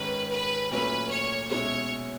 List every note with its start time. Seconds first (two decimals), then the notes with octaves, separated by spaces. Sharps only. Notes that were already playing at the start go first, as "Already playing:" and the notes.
Already playing: G#2 D#3 G#3 C#4 B4
0.32 B4
0.71 A#2 F#3 A3 C#4 B4
1.11 C#5
1.50 B2 G#3 C#4 E4 C#5